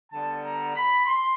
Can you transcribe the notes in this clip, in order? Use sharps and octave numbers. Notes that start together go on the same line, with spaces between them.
D3 G3 B3 A5
A#5
B5
C6